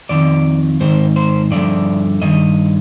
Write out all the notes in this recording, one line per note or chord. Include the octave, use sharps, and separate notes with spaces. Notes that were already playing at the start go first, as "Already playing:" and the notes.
F2 D#3 D5
G#2 D#3 C5
C5
G2 D3 F3 D5
G2 D#3 D#5